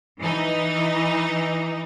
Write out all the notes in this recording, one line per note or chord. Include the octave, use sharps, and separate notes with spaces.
E3 D#4